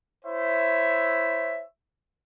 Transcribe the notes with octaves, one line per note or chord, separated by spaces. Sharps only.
E4 C5 C#5 E5